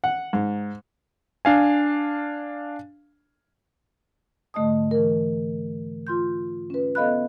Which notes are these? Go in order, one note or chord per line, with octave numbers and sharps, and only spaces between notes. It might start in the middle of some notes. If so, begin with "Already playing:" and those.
F#5
G#2
D4 F5 G#5
G#2 D3 A3 D#5 A5 D#6
E3 A#4
F4 C6 G6
C#4 B4
B3 A4 D#5 F5 B5 F#6